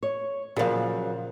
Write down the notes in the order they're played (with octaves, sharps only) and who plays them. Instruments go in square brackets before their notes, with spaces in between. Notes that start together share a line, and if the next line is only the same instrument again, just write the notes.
[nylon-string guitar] C#5
[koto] A#2 F3 [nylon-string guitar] C#3 F#3 [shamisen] G#4 F5